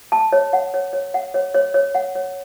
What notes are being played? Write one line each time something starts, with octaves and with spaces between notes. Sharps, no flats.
A5
C#5
F#5
C#5
C#5
F#5
C#5
C#5
C#5
F#5
C#5